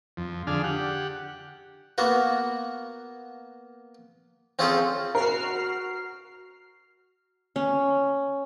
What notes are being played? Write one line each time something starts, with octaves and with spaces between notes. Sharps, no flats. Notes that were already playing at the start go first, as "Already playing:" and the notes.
F2
D3 D4 G#4 F5
G4 F#5
A#3 B3 F#4
C4 C#4 F4 G#4 A4 C5
F#4 A#4 F6 C7
C#4